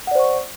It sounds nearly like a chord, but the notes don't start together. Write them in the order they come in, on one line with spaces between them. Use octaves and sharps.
F#5 D5 C5 C#6